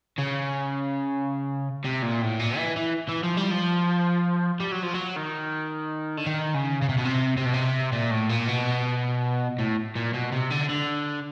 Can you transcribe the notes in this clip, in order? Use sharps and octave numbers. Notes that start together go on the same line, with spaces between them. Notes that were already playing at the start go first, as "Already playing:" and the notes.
C#3
C3
A#2
A2
A#2
E3
E3
E3
F3
G3
F3
G3
F#3
F3
F#3
D#3
D3
D#3
C#3
C#3
C3
B2
C3
C3
B2
C3
A#2
A2
A#2
B2
A2
A#2
B2
C3
D3
D3